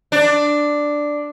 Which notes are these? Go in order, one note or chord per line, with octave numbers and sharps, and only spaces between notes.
D4